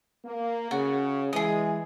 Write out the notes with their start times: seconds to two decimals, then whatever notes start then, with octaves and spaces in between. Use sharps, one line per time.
0.24 A#3
0.71 C#3 F#4
1.33 E3 G#3 G#4 D#6